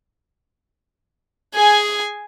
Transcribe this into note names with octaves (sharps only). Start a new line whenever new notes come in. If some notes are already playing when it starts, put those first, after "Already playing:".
G#4 G#5